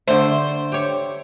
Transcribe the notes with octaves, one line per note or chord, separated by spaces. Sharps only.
D3 A3 C5
G4 C#5